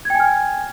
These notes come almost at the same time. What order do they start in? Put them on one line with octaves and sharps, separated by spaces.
G#6 G5 G#5 F6